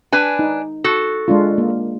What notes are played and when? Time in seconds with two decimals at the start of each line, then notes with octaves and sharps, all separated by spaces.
0.12 D4 B4 G#5
0.39 D#4
0.84 F#4 A4
1.28 G#3 D4 F4
1.58 A#3